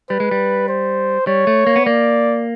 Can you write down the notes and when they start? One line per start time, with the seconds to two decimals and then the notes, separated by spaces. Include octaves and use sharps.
0.10 G3 B4
0.20 G#3
0.31 G3
0.68 C5
1.27 G3 C#5
1.47 A3
1.67 A#3
1.76 B3
1.85 A#3 D5